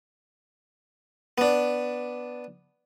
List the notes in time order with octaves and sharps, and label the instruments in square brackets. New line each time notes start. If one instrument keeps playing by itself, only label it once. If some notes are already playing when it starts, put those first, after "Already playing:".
[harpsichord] B3 D4